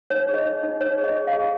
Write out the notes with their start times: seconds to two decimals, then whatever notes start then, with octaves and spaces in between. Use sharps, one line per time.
0.10 D#4 C#5
0.29 G#4
0.34 D#5
0.46 D#4
0.63 D#4
0.81 D#4 C#5
0.98 G#4
1.04 D#5
1.16 G#4
1.27 F5
1.33 G#4